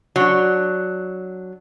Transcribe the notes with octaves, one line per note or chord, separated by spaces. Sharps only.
F#3 D4